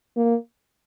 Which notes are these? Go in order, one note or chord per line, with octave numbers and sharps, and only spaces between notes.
A#3